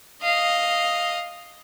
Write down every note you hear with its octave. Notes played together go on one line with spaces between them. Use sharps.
D#5 F5